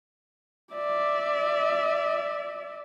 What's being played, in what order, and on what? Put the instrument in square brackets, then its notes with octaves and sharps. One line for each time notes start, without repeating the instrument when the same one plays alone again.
[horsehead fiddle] D5 E5